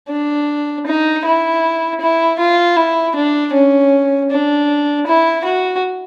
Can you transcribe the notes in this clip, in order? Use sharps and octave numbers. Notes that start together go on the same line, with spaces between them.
D4
D#4
E4
E4
F4
E4
D4
C#4
D4
E4
F#4